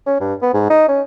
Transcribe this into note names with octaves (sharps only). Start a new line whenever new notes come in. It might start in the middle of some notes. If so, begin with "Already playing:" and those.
C#4
G2
B3
G#2
D#4
C#4